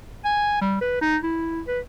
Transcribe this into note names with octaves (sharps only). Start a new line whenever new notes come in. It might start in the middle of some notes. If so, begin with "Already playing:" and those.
G#5
G3
B4
D#4
E4
B4